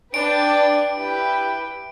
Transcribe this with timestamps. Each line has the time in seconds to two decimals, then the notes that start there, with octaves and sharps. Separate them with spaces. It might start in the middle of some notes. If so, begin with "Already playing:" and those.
0.13 D4 B4 D5 G5 D7
0.96 E4 G4 B4 G5